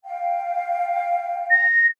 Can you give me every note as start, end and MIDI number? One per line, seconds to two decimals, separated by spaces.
0.05 1.64 77
0.05 1.64 79
1.50 1.86 94